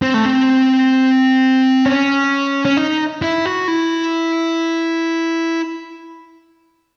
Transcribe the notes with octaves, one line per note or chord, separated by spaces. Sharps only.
C4
A3
C4
C#4
C#4
D#4
E4
F#4
E4